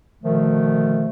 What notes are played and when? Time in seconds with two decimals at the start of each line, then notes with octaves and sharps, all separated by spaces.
0.23 B2 D3 D#3 F3 A3